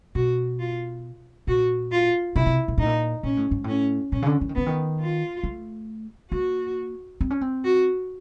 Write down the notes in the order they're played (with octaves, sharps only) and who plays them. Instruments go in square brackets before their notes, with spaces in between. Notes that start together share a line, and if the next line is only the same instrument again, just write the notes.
[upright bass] B2 [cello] F#4
[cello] F4
[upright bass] A#2 [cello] F#4
[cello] F4
[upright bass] C3 [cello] E4
[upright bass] C3
A#2
[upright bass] A2 [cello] D#4
[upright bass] A#2
[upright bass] A#2 [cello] C#4
[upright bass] A2
G#2
[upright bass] A2 [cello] C#4
[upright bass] A#2 [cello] C#4
[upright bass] C#3
D3
E3
D#3
[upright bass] D3 [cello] B3
[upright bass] D#3
[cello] F4
[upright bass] A3
[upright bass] A#3 [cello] F#4
[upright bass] C4
C#4
C4
[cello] F#4